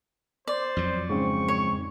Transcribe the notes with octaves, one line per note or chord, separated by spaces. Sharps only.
C5 D5
F2 F#3
G#2 C#3 C4 C#6
C#5